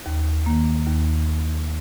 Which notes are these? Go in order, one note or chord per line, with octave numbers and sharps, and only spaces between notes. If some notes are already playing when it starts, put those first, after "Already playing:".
D#2
D#3 A#3
D#2